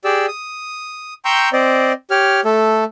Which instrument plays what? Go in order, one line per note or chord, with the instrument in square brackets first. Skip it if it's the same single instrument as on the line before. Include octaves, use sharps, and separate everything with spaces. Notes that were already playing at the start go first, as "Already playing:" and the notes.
[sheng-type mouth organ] G4 G#4 D5 E6
D#6
G5 A#5 C6 C#6 E6 G6
C4 C5 D5 D#5
G4 C#5 F6
A3 A4